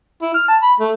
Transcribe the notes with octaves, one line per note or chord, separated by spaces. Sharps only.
E4
F6
A5
B5
A3